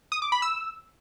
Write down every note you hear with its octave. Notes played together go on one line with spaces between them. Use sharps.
D#6
D6
B5
E6